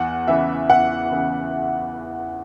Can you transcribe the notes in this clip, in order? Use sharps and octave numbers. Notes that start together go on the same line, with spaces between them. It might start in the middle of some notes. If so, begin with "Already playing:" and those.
Already playing: E2 F#5
C#3 E3 E5
E2 F#5
C#3 E3